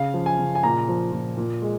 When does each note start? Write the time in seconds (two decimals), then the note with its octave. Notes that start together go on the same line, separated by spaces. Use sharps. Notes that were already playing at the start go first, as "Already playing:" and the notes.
Already playing: C#3 F5
0.14 F3
0.26 G#5
0.39 C#3
0.55 G#5
0.63 A#2 A#5
0.89 F3
1.12 A#2
1.37 A#2
1.62 G#3